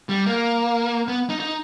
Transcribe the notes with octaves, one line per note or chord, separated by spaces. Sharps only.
G3
A#3
B3
D#4
D#4